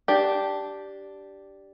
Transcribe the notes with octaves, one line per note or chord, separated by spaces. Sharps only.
D4 G4